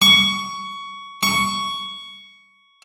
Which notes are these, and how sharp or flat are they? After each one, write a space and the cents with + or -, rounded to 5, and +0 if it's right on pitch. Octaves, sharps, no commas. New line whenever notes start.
C#6 +15
C#6 +10